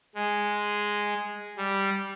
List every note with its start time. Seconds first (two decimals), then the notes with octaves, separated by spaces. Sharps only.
0.15 G#3
1.57 G3